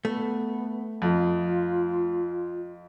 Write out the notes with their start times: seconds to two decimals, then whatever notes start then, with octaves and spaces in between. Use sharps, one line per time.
0.05 A3 B3
1.02 F2 F4